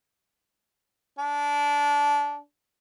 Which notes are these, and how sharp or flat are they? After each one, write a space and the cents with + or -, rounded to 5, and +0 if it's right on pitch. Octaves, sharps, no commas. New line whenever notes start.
D4 -20